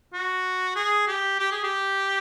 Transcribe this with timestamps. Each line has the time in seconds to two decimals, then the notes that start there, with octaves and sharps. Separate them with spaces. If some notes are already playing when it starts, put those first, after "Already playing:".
0.13 F#4
0.76 G#4
1.08 G4
1.39 G4
1.52 G#4
1.64 G4